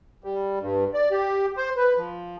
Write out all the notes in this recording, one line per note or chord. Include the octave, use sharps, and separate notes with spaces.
G3
G2
D5
G4
C5
B4
F3